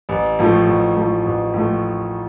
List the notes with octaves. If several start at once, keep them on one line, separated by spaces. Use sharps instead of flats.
A1
A2 F3 A3
A1
A2 F3 A3
A1
A2 F3 A3